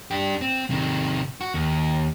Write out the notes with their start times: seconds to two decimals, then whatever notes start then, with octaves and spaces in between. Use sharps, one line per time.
0.11 D4 G4
0.41 C4
0.70 C3 D#3
1.41 F#4
1.54 D#2